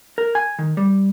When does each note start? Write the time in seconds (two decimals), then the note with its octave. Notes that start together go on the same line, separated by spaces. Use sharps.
0.18 A#4
0.35 G#5
0.59 D#3
0.77 G3